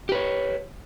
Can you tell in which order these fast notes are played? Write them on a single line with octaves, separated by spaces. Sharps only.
G4 B4 C#5